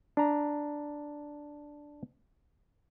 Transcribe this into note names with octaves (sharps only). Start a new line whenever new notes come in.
D4 A#5